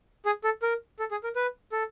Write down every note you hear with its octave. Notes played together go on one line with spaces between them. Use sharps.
G#4
A4
A#4
A4
G#4
A#4
B4
A4